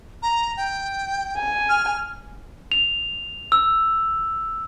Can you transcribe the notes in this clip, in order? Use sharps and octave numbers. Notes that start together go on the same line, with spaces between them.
A#5
G5
G#5
F6
F7
E6